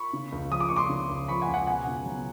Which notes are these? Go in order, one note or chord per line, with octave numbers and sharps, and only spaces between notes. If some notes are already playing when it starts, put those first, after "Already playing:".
Already playing: B5 C#6
C#3
C#2
F3 D#6
D6
C#2 C#6
C6 D6
C#3
C#2
F3 B5 C#6
F#5 G#5
C#2
F#5 G#5
B2 F#5 G#5
C#2
F#3